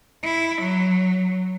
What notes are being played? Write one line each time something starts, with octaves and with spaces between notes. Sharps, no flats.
E4
F#3